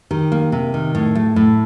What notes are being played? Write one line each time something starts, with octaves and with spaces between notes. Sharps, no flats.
D#3 G4
A#3
C3
D#3
A2
A3
A2